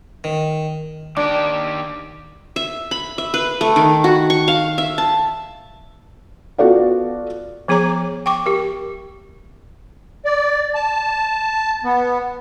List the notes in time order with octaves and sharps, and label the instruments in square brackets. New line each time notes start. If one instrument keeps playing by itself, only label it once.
[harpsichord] D#3
[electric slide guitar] D#3 G4 [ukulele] D4 [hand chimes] D6
[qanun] E5
B5
E5
B4
A3
D#3
F#4
C#6
F5
E5
A5
[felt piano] B3 F4 F#4 A4 D5 F5
[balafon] F3 B3 G#4 C#5 A#5 D6
G5 C#6 D6
G4 A#4
[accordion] D5
A5
B3